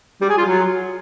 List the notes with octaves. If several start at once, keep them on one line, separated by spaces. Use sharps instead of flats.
G3
G#4
F4
F#3